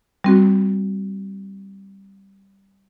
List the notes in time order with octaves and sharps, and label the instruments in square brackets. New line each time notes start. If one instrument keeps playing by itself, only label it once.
[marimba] G3 C4 F#4